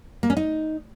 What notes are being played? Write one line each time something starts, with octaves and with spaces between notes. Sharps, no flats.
A#3
C#4
D#4